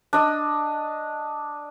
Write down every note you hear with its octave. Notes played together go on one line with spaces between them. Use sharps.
D4 D#5